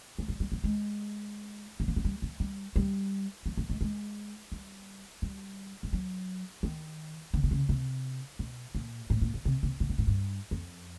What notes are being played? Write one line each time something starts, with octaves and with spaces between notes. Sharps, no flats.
G#3
G3
G3
F#3
G#3
E3
F3
F#3
G3
F#3
G3
G3
F#3
F#3
G#3
G#3
G3
G3
G3
F#3
D#3
D3
C3
C#3
C3
B2
A#2
A2
A#2
B2
C3
C3
C3
B2
A2
G2
F2